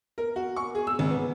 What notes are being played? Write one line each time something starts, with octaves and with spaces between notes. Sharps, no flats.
A#4
F#4
C#6
G#4
E6
G#1
B3